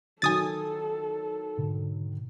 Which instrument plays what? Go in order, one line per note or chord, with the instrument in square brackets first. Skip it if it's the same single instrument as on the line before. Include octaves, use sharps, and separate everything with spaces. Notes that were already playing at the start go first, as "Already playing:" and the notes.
[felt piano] D#3 F#3 [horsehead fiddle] A4 [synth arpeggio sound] G#5 D#6 A6
[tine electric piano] G#2 B2 D3